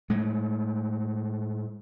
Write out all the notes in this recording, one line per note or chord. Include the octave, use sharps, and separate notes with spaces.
A2 G#3 A3